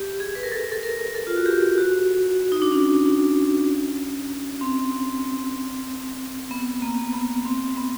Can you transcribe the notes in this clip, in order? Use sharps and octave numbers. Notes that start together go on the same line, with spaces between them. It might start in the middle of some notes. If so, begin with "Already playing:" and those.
Already playing: G4
G#4
B4
A#4
A4
A4
A#4
A4
F4
F#4
G4
F#4
D#4
D4
C#4
C4
B3
A#3
B3
C4
B3